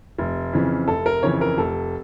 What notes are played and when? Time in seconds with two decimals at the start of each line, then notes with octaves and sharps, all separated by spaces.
0.18 F1
0.53 F2 C#3 E3
0.88 F1 A4
1.06 A#4
1.23 F2 C#3 E3 C#5
1.41 A#4
1.58 F1 A4